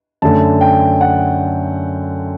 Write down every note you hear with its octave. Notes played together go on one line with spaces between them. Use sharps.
F#2 D3 A3 A5
G5
F#5